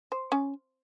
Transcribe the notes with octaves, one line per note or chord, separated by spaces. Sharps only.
C5
C#4